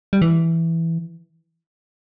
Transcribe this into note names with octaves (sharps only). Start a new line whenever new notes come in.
G3
E3